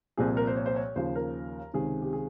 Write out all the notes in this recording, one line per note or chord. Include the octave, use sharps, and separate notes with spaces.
C2 A#2 F3 G#4
A#4
C5
C#5
C5
C#5
D#2 C#3 F3 C5
A#4
C#2 C3 D#3 G#4
G4
G#4